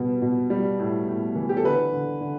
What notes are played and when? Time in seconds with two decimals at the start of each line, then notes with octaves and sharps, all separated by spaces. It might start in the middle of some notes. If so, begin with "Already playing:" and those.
Already playing: B2 G3 B3
0.22 B2
0.50 G3
0.79 A2
1.08 A2
1.35 E3
1.49 G4
1.57 A4
1.65 D3 B4
1.93 D3
2.21 D3